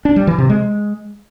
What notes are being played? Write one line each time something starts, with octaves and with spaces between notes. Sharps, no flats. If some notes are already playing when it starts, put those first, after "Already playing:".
D4
G3
E3
C3
G#3